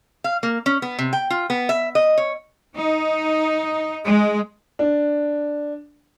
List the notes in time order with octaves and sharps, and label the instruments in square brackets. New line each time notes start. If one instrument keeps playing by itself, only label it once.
[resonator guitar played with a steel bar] F5
A#3
C#4
B3
C3
G5
F4
B3
E5
D#5
C#5
[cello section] D#4
G#3
[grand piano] D4